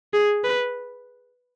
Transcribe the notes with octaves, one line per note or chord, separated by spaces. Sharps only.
G#4
B4